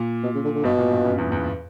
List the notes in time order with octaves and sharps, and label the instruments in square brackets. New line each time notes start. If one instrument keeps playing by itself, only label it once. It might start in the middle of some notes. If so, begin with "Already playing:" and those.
Already playing: [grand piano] A#2
[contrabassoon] B2
C#3
D3
D3
[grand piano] G2 [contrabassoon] B2
[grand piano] A#2
G2
F#2
E2
E2